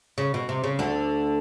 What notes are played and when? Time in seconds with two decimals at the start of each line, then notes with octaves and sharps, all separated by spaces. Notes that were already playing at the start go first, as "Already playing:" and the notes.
0.18 C#3
0.34 B2
0.49 C3
0.64 C#3
0.79 D2 D3